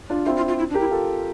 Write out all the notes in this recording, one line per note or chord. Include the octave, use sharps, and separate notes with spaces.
D4 F4
C4 E4 F4
F4
F4
E4
D4
G4 A#4
E4
F4 A4